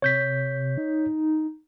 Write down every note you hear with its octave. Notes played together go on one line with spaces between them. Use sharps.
C3 C#5 G6 B6
D#4